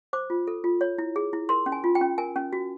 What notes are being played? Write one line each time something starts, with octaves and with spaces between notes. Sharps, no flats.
C5 D6
F4
A4
F4
C#5
E4
G#4
E4
A#4 C6
C#4
G#5
F4
G5
C#4
A#4 G#5
C#4
F#4